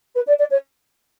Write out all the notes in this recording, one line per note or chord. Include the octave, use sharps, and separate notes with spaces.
B4
D5
D5
C#5